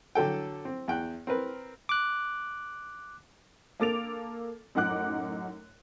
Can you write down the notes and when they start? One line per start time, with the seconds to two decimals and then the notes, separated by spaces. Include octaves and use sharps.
0.15 D3 F#3 A4 G5
0.65 C4
0.88 E2 G5 F#6
1.27 C4 A#4 B4
1.89 D6 F#6
3.80 A#3 A4 D6 A6 D7 F7
4.75 F#2 A2 D#4 F#5 D6 F#6